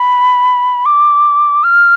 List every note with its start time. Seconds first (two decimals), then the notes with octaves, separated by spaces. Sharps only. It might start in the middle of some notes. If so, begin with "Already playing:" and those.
Already playing: B5
0.86 D6
1.64 F6